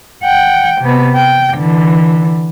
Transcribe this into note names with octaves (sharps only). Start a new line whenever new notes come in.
F#5 G5
C3 B3
G5
D3 E3